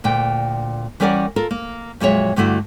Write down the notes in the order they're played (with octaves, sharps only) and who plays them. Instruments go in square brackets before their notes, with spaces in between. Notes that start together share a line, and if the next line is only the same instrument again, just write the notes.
[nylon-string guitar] D2 A#2 G5
E3 G3 C#4 A#4 D5 F#5
F4 A4 A#4
A#3
F2 A#2 F#3 G#3 C#5 E5
G2 D3 A3 E4 F#4